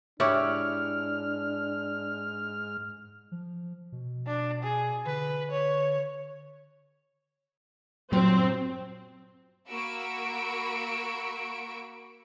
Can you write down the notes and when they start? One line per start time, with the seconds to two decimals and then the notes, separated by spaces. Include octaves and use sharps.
0.20 G#2 D4 E4 G4 C#5 F6
3.32 F3
3.92 B2
4.27 D4
4.63 G#4
5.06 D3 B4
5.51 C#5
8.12 G2 A#2 F#3 C4
9.69 A#3 F#4 B5 C#6 E6 D7